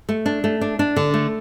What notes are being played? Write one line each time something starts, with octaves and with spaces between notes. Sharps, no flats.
A3
D4
A3
D4
D4
D3
A3